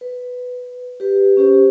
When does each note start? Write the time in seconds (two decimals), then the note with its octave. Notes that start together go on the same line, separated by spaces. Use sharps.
0.01 B4
1.00 G4 B4
1.37 C#4 G4 C5